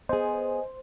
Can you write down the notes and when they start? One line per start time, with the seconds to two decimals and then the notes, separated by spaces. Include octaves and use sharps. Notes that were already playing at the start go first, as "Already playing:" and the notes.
0.09 B3 G#4 C5 D#5 G#5